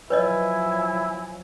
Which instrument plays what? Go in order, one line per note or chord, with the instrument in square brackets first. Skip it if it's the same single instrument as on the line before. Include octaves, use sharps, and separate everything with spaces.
[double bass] F3 F#3 [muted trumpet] E4 [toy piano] B4 C#5 D#5 [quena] G#5